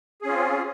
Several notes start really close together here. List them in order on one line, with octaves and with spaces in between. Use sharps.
G#4 C#4 F4 C4